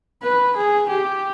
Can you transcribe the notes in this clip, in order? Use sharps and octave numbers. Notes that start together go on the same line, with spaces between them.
B4
G#4
G4